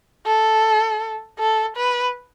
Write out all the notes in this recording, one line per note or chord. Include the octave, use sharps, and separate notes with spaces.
A4
A4
B4